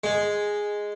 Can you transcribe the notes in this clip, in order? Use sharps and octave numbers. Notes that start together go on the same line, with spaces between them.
G#3